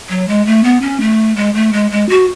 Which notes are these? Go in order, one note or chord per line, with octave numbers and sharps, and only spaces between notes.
F#3
G#3
A3
B3
C#4
A3
G#3
A3
G#3
G#3
F#4